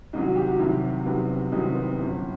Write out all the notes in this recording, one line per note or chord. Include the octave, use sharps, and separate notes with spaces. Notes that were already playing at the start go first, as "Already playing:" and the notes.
C2 C3 D#3 F#3 D#4
F#4
G4
F#4
C2 C3 D#3 F#3 E4
C4
C2 C3 D#3 F#3 B3
C4
C2 C3 D#3 F#3 D#4
C4
B3
C4
G1 F#2 E3